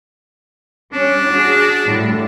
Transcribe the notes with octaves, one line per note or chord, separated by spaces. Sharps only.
G3 C#4 D4
F#4 G#4
A2 D3 G3